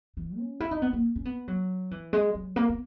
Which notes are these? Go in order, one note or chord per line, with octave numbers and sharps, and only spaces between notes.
E3
C#4
E4
D#4
B3
A#3
C#4
B3
F#3
E3
G#3
F#3
A#3
B3